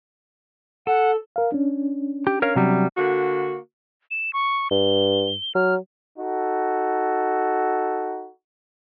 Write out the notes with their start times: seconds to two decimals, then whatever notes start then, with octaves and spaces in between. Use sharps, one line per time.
0.87 A4 F#5
1.36 A#4 F5
1.52 C#4 D4
2.27 G4
2.42 A#4 C#5 F5
2.56 C3 F#3 G3
2.97 D3 A#3 F#4
4.11 E7
4.33 C#6
4.71 G2 G7
5.55 F#3 F6
6.19 D#4 F#4 A4